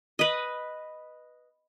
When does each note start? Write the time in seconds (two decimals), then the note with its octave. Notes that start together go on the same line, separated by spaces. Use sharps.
0.19 B4 D#5